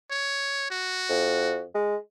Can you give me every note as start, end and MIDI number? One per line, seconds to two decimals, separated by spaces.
0.11 0.68 73
0.71 1.63 66
1.10 1.64 41
1.75 1.96 56